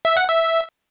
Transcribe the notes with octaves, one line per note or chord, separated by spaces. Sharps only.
E5
F#5
E5